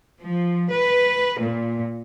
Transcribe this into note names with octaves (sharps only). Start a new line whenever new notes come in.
F3
B4
A#2